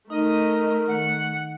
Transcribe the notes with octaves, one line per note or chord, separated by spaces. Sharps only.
A3 D#4 A#4 D#5
D#3 F#5